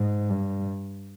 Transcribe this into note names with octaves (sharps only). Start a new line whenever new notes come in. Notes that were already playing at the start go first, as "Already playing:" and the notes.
Already playing: G#2
G2